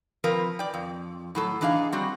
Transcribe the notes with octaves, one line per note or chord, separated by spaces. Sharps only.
F3 C4 A#4 B4
D5 G5
F2
A2 F#3 A4
E3 D4 D#4 G#4 F5
G3 C4 F#4